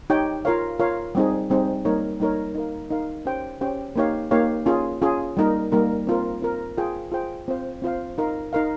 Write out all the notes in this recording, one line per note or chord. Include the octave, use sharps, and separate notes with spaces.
D#4 G4 C#5 G5
F4 A#4 C#5 F5
F4 A#4 C#5 F5
G3 C4 D#4 G#4
G3 C4 D#4 G#4
G3 A#3 D#4 A#4 C#5
G3 A#3 D#4 A#4 C#5
D#4 A#4 F5
D#4 A#4 F5
C#4 G4 C5 G5
C#4 G4 C5 G5
A#3 D#4 G4 C#5 F5
A#3 D#4 G4 C#5 F5
C#4 F4 G#4
C#4 F4 G#4
G3 A#3 D#4 A#4
G3 A#3 D#4 A#4
C4 F4 A#4
C4 F4 A#4
F4 G#4 C5 G5
F4 G#4 C5 G5
C4 F4 C5 F5
C4 F4 C5 F5
D#4 A#4 F5
D#4 A#4 F5